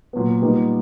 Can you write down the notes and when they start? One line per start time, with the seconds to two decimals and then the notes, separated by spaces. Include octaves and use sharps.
0.13 A#2 F#3 B3
0.42 A#2 G3 B3 D#4